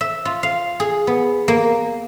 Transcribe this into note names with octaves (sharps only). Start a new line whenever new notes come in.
E5
F4
F5
G#4
B3
A#3